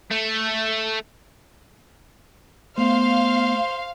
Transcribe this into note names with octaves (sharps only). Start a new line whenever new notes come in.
A3
A3 B3 C5 F5